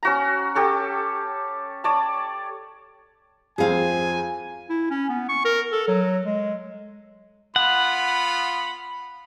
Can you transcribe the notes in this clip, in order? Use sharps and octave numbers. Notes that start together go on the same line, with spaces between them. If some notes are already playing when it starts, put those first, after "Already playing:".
C#4 F#4 A#5
G4 A4 C#5
C#5 D5 A5
F2 C4 F4 G#4 F5 G#5
E4
C#4
B3
C#6
A#4
A4
F#3
G#3
B3 F4 F#5 B5